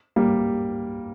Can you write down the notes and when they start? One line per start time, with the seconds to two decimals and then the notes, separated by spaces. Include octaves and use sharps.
0.16 G3 A#3